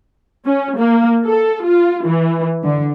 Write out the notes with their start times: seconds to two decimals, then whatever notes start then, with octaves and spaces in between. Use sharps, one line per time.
0.45 C#4
0.77 A#3
1.25 A4
1.65 F4
2.05 E3
2.63 D3